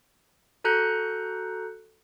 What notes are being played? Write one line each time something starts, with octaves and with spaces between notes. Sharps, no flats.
F#4 A4 A#5 F#6 G6 C#7